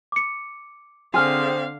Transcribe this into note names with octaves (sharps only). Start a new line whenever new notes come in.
D6 C#7
D3 C4 G#4 C5 F5 C6 F6